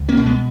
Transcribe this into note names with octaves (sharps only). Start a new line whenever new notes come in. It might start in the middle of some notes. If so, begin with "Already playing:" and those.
Already playing: C#2
A#3 C#4
B2
G#3 B3